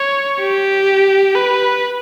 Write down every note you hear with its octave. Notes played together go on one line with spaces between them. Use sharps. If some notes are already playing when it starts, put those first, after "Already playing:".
Already playing: C#5
G4
B4